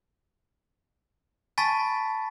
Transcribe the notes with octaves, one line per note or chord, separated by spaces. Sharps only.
G#5 A5 B5 C#6 A6 B6